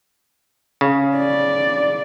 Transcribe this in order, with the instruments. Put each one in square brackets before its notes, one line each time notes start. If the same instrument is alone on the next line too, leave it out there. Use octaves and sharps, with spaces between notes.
[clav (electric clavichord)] C#3
[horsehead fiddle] D5